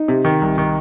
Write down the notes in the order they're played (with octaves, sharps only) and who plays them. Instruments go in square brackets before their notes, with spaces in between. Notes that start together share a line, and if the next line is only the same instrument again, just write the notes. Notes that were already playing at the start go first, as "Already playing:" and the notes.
Already playing: [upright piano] D#4 D#5
[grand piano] C3
D#3
C2
D#3